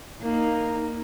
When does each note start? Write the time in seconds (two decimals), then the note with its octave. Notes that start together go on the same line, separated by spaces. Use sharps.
0.22 A#3 D#4